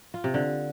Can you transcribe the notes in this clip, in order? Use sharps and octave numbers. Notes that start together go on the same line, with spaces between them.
F4
C3
D3